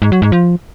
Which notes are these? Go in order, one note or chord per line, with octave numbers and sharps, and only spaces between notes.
G#2
F#3
G#2
F3